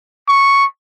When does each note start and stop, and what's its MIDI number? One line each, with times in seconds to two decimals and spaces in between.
0.28 0.65 85